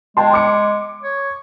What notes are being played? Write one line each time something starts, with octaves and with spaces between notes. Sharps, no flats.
G#3 G5 A5 C6
D6 C#7
C#5